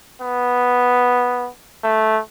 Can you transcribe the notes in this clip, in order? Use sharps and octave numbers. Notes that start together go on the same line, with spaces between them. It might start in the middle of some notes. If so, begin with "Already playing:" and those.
B3
A3